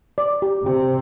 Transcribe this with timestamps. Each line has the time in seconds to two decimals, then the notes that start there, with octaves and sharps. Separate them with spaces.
0.18 D5
0.42 G4
0.65 C3 G4